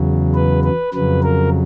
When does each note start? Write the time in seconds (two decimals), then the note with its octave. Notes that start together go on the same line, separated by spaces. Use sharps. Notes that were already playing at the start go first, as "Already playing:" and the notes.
Already playing: E2 C#3 F#3
0.34 B4
0.64 B4
0.93 F2 C#3 F#3 B4
1.23 A#4